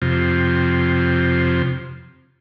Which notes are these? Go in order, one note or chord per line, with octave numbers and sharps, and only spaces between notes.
F2 C3